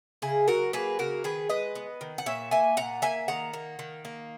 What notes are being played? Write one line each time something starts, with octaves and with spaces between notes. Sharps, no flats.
C#3 E4 G#4
F#3 F#4 A#4
A#3 G#4 B4
C#3 F#4 A#4
D#3 G#4 B4
G#3 B4 D#5
B3
D#3
F#5
A#2 C#5 E5
A#3 E5 G#5
A#2 F#5 A#5
A#3 E5 G#5
D#3 F#5 A#5
A#3
D#3
A#3